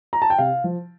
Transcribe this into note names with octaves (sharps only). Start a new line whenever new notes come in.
A#5
A5
G5
C3 F5
F3